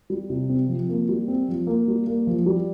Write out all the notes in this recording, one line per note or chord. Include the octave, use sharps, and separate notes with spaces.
G3
C3
C4
F3
A#3
G3
C4
F3
A#3
G3
A#3
F3
G3